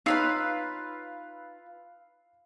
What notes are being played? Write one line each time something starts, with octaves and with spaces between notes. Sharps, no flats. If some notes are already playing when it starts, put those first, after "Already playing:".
D#4 F4 B4 C#5 F5 B5 E6 C7